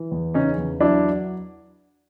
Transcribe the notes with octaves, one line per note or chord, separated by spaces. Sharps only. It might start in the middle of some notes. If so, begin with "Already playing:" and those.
Already playing: E3
E2
C#3 C#4 D#4
E2
F#3 D4 E4